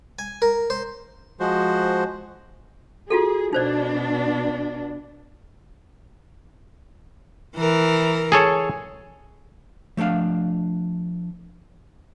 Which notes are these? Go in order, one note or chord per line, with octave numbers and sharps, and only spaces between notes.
G#5
A#4
C5
F3 G#3 F#4 C5
F4 F#4 G#4 A4
B2 D4 D#4 C5 D5
E3 A#4
G#4 A4 C#5
F3 A3 A#3 D4 F5